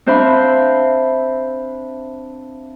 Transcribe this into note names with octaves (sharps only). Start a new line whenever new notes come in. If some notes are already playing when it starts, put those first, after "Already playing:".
C4 D4 C5 E5 F5 B5